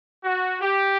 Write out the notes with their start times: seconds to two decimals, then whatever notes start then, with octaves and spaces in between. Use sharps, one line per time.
0.24 F#4
0.62 G4